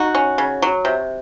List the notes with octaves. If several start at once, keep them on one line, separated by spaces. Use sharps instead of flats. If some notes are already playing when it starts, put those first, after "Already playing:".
Already playing: D#4 F#4
C#4
C#3
F#3
C3